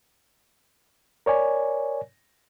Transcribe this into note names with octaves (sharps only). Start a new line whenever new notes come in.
A#4 C#5 D5 G#5